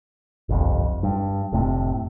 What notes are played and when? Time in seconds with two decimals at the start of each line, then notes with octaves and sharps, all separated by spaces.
0.49 G1 C2 F2
1.03 G2
1.53 F1 A2 C3